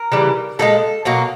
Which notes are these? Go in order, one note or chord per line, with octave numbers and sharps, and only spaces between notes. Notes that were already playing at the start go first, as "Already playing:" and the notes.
Already playing: A#4
C#3 E3 G3
A#2 F3 G#3 A4
B2 F#3 A#3